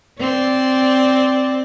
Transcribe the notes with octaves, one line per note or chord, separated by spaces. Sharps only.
C4 D5